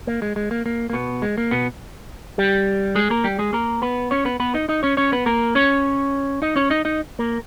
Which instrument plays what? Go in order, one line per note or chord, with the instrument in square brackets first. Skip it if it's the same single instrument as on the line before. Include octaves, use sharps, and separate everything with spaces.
[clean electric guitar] A#3
G#3
G#3
A#3
A#3
A#3
B2 B3
G#3
A#3
B2 B3
G3 G4
G#3 G#4
A#3 A#4
G3 G4
G#3 G#4
A#3 A#4
B3 B4
C#4 C#5
B3 B4
B3 B4
D#4 D#5
D#4 D#5
C#4 C#5
C#4 C#5
B3 B4
A#3 A#4
C#4 C#5
D#4 D#5
C#4 C#5
D#4 D#5
D#4 D#5
A#3 A#4